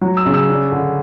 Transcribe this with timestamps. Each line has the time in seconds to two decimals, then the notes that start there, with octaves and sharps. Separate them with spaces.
0.01 F#3
0.17 E6
0.26 C#3
0.34 E6
0.49 D4
0.72 D3